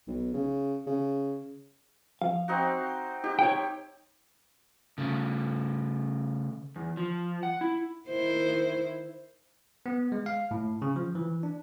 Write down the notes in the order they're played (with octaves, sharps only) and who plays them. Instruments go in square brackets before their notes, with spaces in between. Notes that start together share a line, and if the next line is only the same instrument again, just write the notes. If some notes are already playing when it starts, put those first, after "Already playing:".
[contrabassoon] B1
C#3
C#3
[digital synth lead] F3 [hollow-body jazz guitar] F5
[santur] C4 D#4 F#4
[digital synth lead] G6
[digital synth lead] D#4 [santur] G4
[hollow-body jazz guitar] C#5 G5
[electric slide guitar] C#3 A3
E2
F3
F#5
E4
[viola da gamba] D#3 E4 C5
[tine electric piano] B3
G#3
F5
A2
C#3
F3
E3
D4